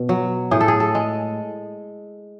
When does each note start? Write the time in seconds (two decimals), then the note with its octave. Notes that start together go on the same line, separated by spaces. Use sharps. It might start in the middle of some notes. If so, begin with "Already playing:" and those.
Already playing: B2
0.09 F#3
0.51 A2 G#4
0.61 A4
0.68 G#4
0.80 A4
0.95 G#3